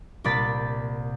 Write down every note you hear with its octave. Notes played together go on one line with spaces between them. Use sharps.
C2 A#2 D5 B5 A6